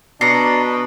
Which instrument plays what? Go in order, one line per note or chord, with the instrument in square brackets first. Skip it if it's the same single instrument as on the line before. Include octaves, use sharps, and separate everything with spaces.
[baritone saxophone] B2 [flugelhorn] D4 [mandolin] A#5 [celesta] C7 C#7